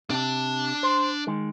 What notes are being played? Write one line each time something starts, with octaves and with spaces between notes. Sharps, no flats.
C3 D4 A5
C5
D#3 G#3